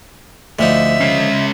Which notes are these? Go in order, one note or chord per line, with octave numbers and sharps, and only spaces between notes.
D2 D3 F3 D#4 E5
G#3 C#4 C7